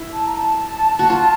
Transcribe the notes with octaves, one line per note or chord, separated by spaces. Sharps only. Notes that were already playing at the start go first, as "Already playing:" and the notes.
Already playing: E4
A5
A#5
A5
F#4
F4